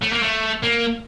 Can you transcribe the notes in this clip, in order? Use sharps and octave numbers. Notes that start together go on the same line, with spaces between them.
A3
A#3
A3
A#3